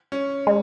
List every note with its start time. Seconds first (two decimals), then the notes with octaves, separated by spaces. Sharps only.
0.12 C#4
0.47 G#3